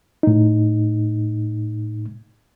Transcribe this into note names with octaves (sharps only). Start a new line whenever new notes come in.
A2 D#4